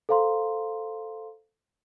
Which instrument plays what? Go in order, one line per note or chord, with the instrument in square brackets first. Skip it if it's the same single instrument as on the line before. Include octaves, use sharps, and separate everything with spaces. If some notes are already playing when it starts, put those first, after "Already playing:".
[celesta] A4 C5 F5 A#5 C6